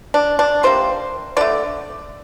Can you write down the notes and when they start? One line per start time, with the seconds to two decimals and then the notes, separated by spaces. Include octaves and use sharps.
0.14 D4
0.39 D4
0.63 C3 G3 A#3 C5
1.37 D3 A3 D5